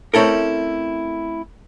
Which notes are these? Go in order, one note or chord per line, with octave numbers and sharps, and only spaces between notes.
A3 C4 C#4 E4 A4 A#4